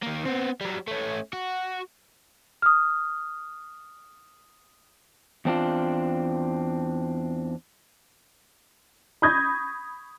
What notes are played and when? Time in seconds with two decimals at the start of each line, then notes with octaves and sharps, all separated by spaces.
0.03 D#3 A#3
0.25 B3 C4
0.61 F#3 G3
0.88 A3 C#4
1.33 F#4
2.62 D#6 F6
5.45 E2 C4 D4 F4
9.22 B5 C#6 D#6 G6 G#6 A#6